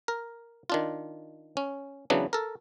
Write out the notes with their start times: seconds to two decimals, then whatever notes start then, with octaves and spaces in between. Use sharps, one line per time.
0.08 A#4
0.70 D#3 D4 F4
1.57 C#4
2.10 C#3 E3 F#3 B3 D4
2.33 A4 A#4